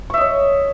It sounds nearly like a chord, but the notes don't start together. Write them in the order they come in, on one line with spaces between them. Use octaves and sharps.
C#6 E5 D#5 C#5